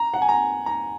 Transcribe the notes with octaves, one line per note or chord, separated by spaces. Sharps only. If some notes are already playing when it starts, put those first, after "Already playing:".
Already playing: A#5
F#5
G#5
A#5
A#5